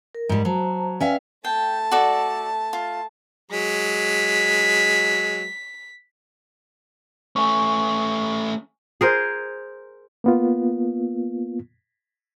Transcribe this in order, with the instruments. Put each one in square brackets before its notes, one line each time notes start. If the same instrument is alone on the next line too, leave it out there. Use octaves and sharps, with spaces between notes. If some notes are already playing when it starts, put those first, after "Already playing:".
[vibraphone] A#4
[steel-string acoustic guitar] G#2 G3
[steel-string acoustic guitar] F#3 [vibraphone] C5 A5 A#5
[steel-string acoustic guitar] C#4 E5 F5 [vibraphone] B4 D5 G5
[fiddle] A3 A5 [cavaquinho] G5
[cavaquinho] F#4 A4 D5
F4
[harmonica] F#3 G#3 [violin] B6
[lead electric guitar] A3 C#4 [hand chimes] G#5 C#6
[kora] G#4 A#4 C5
[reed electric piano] A#3 B3 F4